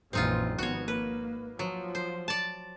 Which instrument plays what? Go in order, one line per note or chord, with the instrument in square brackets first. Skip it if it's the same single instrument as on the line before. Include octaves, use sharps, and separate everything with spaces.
[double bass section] A#1 F#2 E3 [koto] C4 D#4 F4
[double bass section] G#1 F3 B3 [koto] F#4 C#5
[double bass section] A#3 [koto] B4
[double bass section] F3 [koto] F#3
[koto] C5
D5 A5